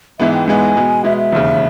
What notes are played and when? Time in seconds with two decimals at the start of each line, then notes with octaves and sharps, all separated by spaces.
0.19 G#2 E3 G#3 B3 E5
0.34 G5
0.48 G#2 E3 G#3 B3 G#5
0.76 B2 G#3 B3
1.04 B2 G#3 B3 E5
1.18 E5
1.32 E1 D#2 C#3